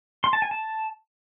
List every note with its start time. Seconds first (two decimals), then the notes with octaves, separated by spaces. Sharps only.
0.24 C6
0.33 A5
0.42 G#5
0.51 A5